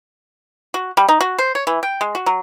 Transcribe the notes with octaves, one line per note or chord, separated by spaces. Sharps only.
F#4
G3
D#4
F#4
C5
C#5
E3
G5
G#3
F#4
F#3